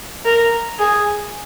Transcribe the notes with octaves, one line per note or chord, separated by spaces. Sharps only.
A#4
G#4